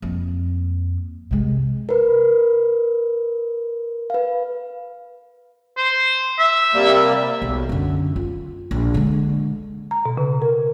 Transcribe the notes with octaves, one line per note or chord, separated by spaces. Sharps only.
F2 A#3
C3 G#3
A#4 B4
B4 F5
C5
E5
C3 G3 A#3
B1
F#2 D3
F4
A#1
D3 G#3
A#5
B2
C#3
A#4